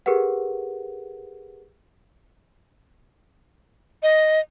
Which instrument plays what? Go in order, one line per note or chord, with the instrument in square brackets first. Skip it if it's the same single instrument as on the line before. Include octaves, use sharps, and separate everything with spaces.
[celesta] G4 G#4 A#4 B4 F#5
[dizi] D#5